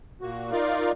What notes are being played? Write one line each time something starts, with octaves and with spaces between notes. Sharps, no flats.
A#2 A#3 F#4
D#4 F4 A#4 D5 F5